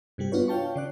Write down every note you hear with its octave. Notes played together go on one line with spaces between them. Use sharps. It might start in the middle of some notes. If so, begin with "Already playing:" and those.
G2 C3 G3 G4
B3 D4 F4 F#4 B4 C#5
C#5 F5 G5 A5 C#6
C#3 D5 F#6